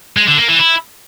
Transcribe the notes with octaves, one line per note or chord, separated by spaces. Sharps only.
G#3
D3
A#3
E3
E4